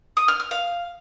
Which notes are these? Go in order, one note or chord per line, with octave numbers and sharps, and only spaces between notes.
D#6
F6
F6
F5